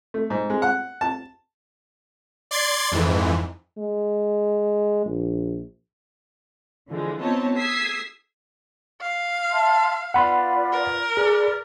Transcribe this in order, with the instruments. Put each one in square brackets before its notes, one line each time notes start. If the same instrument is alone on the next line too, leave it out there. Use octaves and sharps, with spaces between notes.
[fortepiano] A3
G#2
G#3
F#5
A5
[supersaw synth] D5 C6 G#6 A6 C7
F2 G#2 E3
[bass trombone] G#3
A#1
[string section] D3 E3 F3 G#3
B3 C4 D#4 F4 C#5 A5
D#6 E6 G#6 B6 C7
[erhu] F5
[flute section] E5 A5 C6
[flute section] F4 B4 D5 [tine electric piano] F#5 B5 C6
[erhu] A#4
[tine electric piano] G#4 [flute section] B4 D5 F6